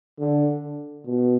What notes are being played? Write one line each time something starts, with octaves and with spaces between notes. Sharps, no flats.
D3
B2